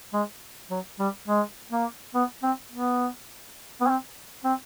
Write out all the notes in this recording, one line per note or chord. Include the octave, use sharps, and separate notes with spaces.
G#3
F#3
G3
G#3
A#3
B3
C4
B3
B3
C4
C4